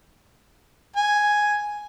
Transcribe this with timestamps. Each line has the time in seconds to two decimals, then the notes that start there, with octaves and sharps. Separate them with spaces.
0.96 G#5